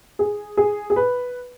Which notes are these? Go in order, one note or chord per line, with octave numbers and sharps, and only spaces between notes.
G#4
G#4
G#4
B4